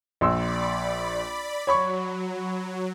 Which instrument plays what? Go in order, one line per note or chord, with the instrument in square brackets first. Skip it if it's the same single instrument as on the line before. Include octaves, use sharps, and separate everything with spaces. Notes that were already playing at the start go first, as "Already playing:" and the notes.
[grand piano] A#1 C6 E6 [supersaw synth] D5 B5
[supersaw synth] F#3 [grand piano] C#5 B5 C#6